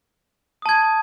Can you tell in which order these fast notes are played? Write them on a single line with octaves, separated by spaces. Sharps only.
D#6 A5 G#6